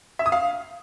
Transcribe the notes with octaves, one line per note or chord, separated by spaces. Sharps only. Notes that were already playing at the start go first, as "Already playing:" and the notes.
E5
D#6
F5